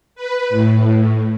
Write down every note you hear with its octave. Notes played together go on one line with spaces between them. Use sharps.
B4
A2